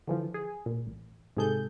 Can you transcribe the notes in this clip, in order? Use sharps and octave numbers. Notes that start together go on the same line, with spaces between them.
D3 E3 F3
G#4
A#2
A1
G#2 C3 G#4 A4 G6